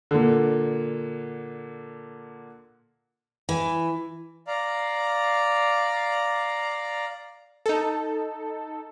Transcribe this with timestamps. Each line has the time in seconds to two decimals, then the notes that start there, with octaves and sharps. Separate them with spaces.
0.11 A#2 D3
3.49 E3
4.47 D5 F5 A#5
7.66 D#4 A4